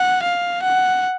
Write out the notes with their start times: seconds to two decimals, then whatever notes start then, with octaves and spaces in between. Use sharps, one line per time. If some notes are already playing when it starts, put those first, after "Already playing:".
Already playing: F#5
0.23 F5
0.63 F#5